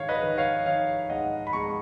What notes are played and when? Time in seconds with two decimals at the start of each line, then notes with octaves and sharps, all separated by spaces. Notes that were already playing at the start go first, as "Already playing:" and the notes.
Already playing: G#2 D#3 C#5 F5
0.09 B4 D#5
0.23 D#3
0.38 C#5 F5
0.66 D#3 C#5 F5
1.10 G#2 D#5 F#5
1.47 B5
1.53 G#3 A#5 C#6